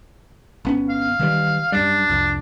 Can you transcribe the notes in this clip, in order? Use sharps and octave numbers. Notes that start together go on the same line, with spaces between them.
G1 B3 C#4
F5
D#3 E3 G3
F#2 G3 D4
C2 F2